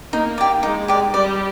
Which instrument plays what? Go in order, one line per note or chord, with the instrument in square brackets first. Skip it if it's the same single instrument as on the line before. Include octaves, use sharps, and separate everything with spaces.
[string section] A#3 [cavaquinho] D#4
[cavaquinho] G4 D5
[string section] G#3 [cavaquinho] D#4
[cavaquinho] G4 D5
[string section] G3 [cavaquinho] D5